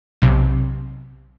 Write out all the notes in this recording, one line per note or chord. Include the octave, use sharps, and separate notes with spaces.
B1 C3